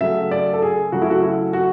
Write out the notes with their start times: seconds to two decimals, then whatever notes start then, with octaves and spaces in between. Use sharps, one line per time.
0.01 C#3 F#3 A3 E5
0.31 D5
0.53 A4
0.62 G#4
0.92 C#3 F#3 A3 F#4
1.02 E4
1.10 F#4
1.23 E4
1.53 F#4